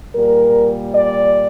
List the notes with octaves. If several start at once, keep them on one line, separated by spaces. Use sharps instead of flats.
A#2 G3 A#4
D5